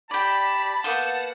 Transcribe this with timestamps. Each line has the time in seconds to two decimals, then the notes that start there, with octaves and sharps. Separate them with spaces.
0.11 G4 D5 A5 B5
0.84 A#3 B3 F#5 G6